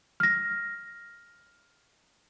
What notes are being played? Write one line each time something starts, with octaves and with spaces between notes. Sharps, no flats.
F6 A#6